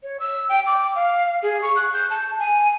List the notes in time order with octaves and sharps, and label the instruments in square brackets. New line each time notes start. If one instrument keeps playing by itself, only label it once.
[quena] C#5
E6
G5
D6
F5
G#4
C#6
F#6
G6
A5
G#5